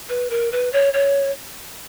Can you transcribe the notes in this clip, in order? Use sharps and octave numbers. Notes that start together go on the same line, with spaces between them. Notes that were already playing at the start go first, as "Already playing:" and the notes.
B4
A#4
B4
C#5
C#5